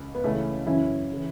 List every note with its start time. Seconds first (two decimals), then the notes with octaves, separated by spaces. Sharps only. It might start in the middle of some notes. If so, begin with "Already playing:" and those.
Already playing: C#2
0.15 B3
0.23 C#2 C#3 E3 A3 C#4
0.66 F#2 C#3 E3 C#4 E4
1.12 C#3 E3